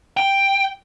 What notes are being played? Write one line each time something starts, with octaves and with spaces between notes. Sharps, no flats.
G5